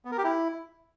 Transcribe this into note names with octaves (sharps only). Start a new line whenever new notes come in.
B3
A#4
G4
E4